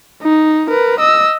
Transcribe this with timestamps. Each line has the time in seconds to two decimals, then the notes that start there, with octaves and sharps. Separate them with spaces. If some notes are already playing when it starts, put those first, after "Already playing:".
0.23 D#4
0.70 A#4 B4
1.00 D#5 E6